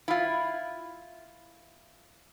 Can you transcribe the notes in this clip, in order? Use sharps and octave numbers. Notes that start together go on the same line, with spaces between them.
E4 F4